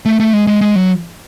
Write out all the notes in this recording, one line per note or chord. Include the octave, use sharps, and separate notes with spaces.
A3
A3
G#3
G#3
G#3
F#3